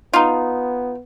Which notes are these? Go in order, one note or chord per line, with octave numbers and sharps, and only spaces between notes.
B3 D#4 F4